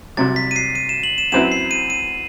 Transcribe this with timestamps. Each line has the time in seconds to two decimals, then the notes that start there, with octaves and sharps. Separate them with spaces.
0.17 C2 C3 F#3 A6
0.36 B6
0.51 D#7
0.56 C7
0.75 D#7
0.89 E7
1.03 F#7
1.18 E7
1.32 F#2 F#3 C4 E4 B4 E7
1.52 C7
1.71 D#7
1.90 D#7